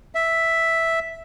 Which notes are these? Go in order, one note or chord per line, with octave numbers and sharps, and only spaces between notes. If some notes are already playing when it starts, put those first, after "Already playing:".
E5